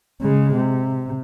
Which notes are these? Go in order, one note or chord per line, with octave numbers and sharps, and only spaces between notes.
C#3 G#3
C3